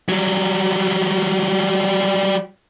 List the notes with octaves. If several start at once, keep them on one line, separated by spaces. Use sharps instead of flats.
F#3 G3